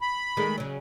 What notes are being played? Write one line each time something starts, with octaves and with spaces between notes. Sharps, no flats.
B5
D#3 G#3 A3
C#3 F#3